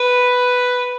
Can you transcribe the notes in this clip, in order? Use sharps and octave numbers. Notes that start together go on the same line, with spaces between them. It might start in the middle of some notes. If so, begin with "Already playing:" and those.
Already playing: B4